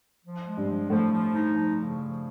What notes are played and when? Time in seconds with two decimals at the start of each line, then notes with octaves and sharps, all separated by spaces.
0.24 F3
0.46 G#3
0.57 G2
0.68 F3
0.90 A2 F3
1.13 F3
1.34 D#4
1.56 F3
1.78 C#3
2.00 F3